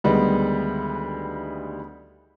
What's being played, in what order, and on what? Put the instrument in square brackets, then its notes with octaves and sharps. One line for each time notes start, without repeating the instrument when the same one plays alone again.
[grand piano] D2 D#3 G3 G#3 B3